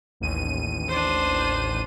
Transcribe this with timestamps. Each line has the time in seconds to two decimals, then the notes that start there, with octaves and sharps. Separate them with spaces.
0.20 A1 D#2 D#7
0.89 D4 C5